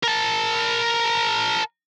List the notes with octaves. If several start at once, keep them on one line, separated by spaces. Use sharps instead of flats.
A#4 A5